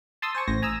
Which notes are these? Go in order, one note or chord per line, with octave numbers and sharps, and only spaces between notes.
A5 C6 D#6 E6
C5 G#5 C#6
A1 C5 A#6
G#5 A#5 D#6 E6